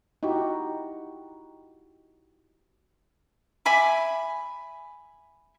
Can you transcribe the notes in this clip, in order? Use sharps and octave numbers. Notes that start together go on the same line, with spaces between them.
D#4 E4 F#4 G4
E5 G#5 B5 D6